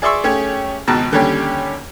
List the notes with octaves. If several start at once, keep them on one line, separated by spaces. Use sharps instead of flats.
G#4 D5 E5 C6 C#6 E6
A3 C#4 G4 G#4 C#5
G#1 C#2 B2 A5 A#5
D#2 D3 G3 C#4 G4